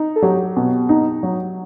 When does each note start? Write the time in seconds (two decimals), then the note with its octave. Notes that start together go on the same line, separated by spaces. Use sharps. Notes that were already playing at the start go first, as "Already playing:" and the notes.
Already playing: D#4
0.16 A4
0.22 F#3 G4
0.57 B2
0.89 D#4
1.23 F#3